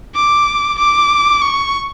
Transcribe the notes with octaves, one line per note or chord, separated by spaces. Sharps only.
D6
D6
C#6